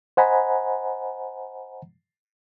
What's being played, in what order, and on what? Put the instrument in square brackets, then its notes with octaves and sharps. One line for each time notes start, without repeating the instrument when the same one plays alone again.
[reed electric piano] C5 D#5 F#5 G#5 A#5 B5